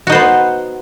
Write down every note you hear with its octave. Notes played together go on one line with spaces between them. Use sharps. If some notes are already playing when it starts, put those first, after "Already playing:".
B3 D#4 F#4 C5